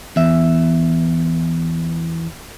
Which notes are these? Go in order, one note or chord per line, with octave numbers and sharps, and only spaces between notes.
E2 E5